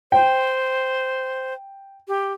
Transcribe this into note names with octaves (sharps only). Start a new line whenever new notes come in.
C5 G5
G4